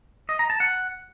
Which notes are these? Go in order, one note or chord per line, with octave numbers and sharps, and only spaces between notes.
D#5
A#5
A5
F#5